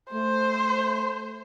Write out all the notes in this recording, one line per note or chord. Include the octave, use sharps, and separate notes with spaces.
A3 C5